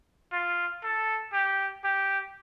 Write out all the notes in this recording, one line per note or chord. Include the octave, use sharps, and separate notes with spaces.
F4
A4
G4
G4